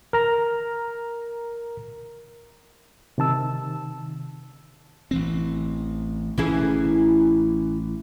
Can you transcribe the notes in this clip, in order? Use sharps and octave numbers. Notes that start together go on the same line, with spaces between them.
A#4 A#5
C3 D#3 A5 E6
A1 E3 C4
A1 E3 C#4 E4 G#4